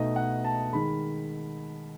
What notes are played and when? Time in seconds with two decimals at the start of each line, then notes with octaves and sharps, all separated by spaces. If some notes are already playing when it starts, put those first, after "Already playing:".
Already playing: B2 A3 D#4 D#5
0.16 F#5
0.44 A5
0.72 D#3 G#3 B5